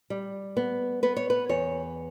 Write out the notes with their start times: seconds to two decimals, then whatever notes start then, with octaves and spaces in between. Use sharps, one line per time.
0.10 G3
0.57 B3
1.03 B3 B4
1.17 C#5
1.30 B4
1.49 E2 C#5